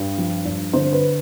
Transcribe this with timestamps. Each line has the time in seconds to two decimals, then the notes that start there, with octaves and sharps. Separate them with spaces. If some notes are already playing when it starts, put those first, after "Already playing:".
Already playing: G2
0.18 F3
0.45 G2
0.73 D3 C5
0.93 B4